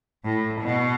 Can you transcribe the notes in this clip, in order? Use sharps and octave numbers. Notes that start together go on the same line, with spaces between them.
A2
B2